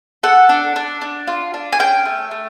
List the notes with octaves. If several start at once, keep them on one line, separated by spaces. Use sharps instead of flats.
A4 F#5
D4
D4
D4
F4
D4
G#5
C#4 G5
A3
A3